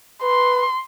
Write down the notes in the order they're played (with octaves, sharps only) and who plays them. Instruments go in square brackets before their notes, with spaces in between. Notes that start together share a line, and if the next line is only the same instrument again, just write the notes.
[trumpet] B4 [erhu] C6